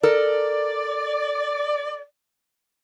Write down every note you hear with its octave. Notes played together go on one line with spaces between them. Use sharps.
A4 A#4 D5